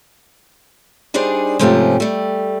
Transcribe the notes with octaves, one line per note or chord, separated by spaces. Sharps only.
G3 D4 D#4 G#4 C5 D5
G#2 C3 F3 A3 C#4 G4
G3 A3